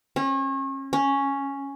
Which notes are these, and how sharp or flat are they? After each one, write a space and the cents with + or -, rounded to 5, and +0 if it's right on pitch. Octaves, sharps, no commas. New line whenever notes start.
C#4 -35
C#4 +0